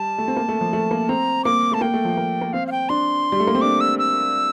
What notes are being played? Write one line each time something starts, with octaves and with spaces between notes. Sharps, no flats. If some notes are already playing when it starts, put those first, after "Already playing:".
Already playing: G3 A5
A3
C4
A#3
A3
F3
A3
A#3
C4 A#5
A#3 D6
A3 A5
A#3 G5
A3
F3
A#3
A#3
C4 F5
F5
G5
D4 C6
G3
A3
A#3
C4
D4 D6
E6
E6